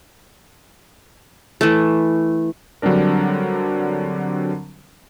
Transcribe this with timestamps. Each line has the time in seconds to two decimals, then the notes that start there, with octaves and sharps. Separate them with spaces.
1.61 E3 A3
2.82 D3 F#3 G3 C4 D4 A#4